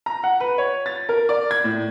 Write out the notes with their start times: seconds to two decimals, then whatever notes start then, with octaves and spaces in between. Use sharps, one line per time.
0.06 A#5
0.24 F#5
0.40 B4
0.58 C#5
0.86 A6
1.09 A#4
1.29 D5
1.51 G#6
1.64 A2